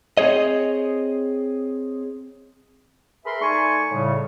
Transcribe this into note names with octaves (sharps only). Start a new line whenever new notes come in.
C4 G#4 C#5 D#5
G#4 A#4 B4 E5 B5 C6
A3 D#4 D5 G#5 C6 C#6
A2 C#3 G3